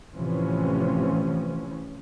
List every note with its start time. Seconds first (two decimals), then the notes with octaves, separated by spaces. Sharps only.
0.15 A2 C3 E3 F3 C#4